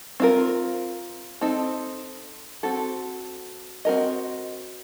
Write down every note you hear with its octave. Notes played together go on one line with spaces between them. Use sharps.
C4 F4 A#4
C4 D#4 A4
C4 F#4 A4
C4 F#4 A#4 D#5